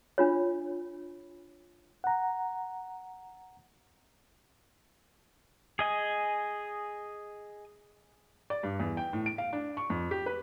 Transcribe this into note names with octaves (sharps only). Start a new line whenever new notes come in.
D4 F4 C#5
F#5 A#5
G#4 D#5 G#5
D5
G2
E2
G5
A2
D7
F5
D4
C#6
F2
G4
B4